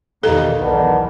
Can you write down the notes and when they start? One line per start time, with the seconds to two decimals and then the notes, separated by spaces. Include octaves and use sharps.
0.23 E2 B2 D#3 G3 A#3 D#4 A4
0.60 B1 E2 D#3 B3 D4